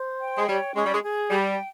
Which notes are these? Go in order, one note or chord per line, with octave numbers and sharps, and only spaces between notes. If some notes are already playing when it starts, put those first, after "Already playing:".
Already playing: C5
G5
G#3
G3 C#5
G#3 C#4
G3
G#3
G#4
G3 G5